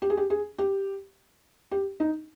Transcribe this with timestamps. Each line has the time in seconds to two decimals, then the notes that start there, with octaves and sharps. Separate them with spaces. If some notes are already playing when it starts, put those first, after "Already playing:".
0.02 G4
0.10 G#4
0.17 G4
0.30 G#4
0.58 G4
1.71 G4
2.00 D#4